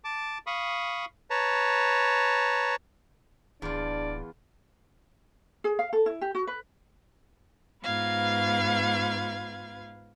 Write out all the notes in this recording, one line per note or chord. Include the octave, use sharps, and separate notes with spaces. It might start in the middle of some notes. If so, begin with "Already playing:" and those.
A5 D6
F5 B5 C#6 D#6
B4 C#5 A5 A#5
D1 E2 D4 F4 D5
G#4
F5
A4
E4
G4
F#4
B4
G#2 B3 F4 B4 F5 G#6